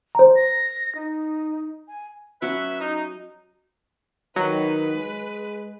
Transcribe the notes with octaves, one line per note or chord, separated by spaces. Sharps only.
C5 A#5
A#6
D#4
G#5
F#3 C#4 F#4 B4 E5
D#4
D#3 F#3 B4
G#3